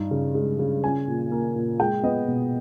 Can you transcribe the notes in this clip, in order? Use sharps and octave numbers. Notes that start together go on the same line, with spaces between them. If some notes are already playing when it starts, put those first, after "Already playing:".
Already playing: G2 D#4
C#3
G#3
C#3
C#4 G#5
A#2
A#3
A#2
G#3 G5
B3 D#5
B2